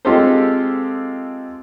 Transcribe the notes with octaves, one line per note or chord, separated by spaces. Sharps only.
G#3 C4 F4 G4 A4 C5